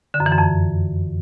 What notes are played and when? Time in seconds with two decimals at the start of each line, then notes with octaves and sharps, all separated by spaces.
0.14 D3
0.20 F#2
0.26 E3
0.32 F#2
0.38 F2